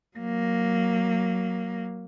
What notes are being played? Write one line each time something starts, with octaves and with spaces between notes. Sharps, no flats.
F#3 A#3